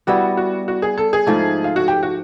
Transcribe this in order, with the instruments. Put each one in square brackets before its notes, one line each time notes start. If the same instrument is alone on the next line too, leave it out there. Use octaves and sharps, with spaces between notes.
[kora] G3 B3 E4 [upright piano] F#4
[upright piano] F#4
F#4
G#4
A4
G#4
[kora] G#2 F3 A3
[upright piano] F4
F#4
G4
F#4